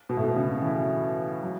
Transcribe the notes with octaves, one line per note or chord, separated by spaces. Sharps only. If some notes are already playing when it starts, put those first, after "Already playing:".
B2
A2
B2
C#3
E3
F#3